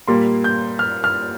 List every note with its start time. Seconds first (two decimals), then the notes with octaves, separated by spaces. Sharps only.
0.08 A#2 G3 A#3 C6
0.44 G6
0.79 F6
1.04 F6